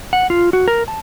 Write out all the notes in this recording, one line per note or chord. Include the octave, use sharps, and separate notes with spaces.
F#5
F4
F#4
A#4
A5